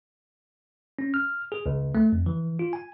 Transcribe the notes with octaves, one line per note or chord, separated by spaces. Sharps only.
C#4
F6
G#4
C#2
A3
F2
E3
F4
G#5